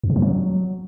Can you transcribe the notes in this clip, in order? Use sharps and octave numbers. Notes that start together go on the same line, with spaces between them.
F2
C3
F3
F#3